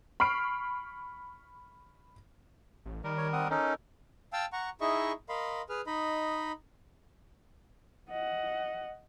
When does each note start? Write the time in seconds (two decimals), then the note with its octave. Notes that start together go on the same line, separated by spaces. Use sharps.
0.20 B5 C#6 F6 C7 D7
2.85 A1
3.04 D#3 G3 A#4
3.18 C#5
3.33 C4 F#5 D#6
3.50 C#4 D#4 A4 A#4 D#5
4.33 F5 G5 A5 E6
4.53 F#5 A#5 C#6
4.81 D#4 E4 G#4 D#5 E5 C#6
5.29 A#4 D#5 F5 B5 C6
5.69 G#4 B4 F6
5.87 D#4 D#5 B5
8.10 D#5 F#5